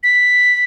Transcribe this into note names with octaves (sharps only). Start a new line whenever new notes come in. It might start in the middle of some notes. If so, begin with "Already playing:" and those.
B6